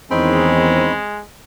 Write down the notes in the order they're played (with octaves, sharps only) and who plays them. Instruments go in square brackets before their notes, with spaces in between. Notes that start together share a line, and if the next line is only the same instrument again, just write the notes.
[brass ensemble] E2 D#3 [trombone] G#3 [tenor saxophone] C4 [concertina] C#4 D#4 B5